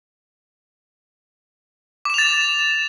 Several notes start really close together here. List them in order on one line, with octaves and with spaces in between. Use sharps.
D6 E7 F7 A6